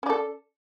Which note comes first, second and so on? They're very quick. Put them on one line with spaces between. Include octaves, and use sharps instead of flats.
C#4 D5 A4